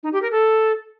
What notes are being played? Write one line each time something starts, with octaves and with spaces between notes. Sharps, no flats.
D#4
G4
A#4
A4